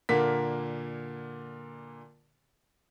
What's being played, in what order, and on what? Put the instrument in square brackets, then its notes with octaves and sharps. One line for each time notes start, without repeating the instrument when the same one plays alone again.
[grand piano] A#2 D3 A#3 B6